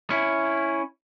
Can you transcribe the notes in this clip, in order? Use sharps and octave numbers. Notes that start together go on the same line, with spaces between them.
C#4 E4